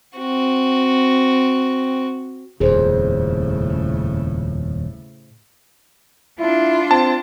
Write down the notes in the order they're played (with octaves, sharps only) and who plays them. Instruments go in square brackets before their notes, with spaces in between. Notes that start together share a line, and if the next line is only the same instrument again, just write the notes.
[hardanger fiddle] C4 F#4
[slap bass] D#1 F2 [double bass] A2 C#3 [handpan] G#4 C5
[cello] D4 F4 [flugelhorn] E4
[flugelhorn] C4 [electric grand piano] A5